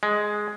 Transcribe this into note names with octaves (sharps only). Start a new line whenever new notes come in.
G#3